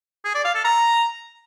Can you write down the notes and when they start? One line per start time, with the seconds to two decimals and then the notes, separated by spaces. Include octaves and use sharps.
0.25 G#4
0.35 D5
0.45 F5
0.55 A4
0.65 A#5